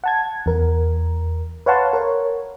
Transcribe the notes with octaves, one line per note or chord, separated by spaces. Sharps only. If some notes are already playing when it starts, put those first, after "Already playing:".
F#5 A5 G#6
E2 A#4
B4 C#5 F5 F#5 A5 C6
A#4 C#5